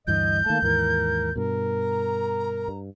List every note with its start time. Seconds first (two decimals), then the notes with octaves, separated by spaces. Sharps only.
0.07 D2 G2 E3 D#5 G6
0.46 D#3 A3 A#3 A5
0.62 D#2 G#2 E3 A#4
1.36 G2 B2 A#4
1.80 A#5
2.68 G2